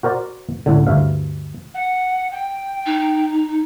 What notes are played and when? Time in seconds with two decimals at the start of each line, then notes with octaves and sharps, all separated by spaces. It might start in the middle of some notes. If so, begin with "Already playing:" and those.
0.03 F#4 A#4 C5 D5
0.66 C#2 A2 D3
0.87 D2 G2 E5 F5
1.74 F#5
2.32 G5
2.86 D#4